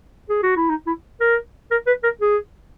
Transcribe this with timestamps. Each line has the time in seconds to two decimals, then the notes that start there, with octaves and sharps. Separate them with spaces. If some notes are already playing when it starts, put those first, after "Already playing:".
0.29 G#4
0.43 F#4
0.56 E4
0.70 D#4
0.87 E4
1.21 A#4
1.71 A#4
1.87 B4
2.04 A#4
2.22 G#4